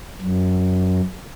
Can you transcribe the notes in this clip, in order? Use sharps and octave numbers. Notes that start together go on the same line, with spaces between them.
F#2